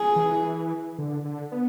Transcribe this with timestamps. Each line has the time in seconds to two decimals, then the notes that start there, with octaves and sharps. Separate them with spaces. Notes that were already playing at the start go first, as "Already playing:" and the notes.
Already playing: G#4
0.16 E3
0.98 D3
1.25 D3
1.52 B3